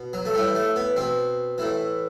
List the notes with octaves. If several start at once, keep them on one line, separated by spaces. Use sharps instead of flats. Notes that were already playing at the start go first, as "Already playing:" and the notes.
Already playing: B2
F#3
A3
A2 E3 G3
A3
B3
B2 C4
A2 E3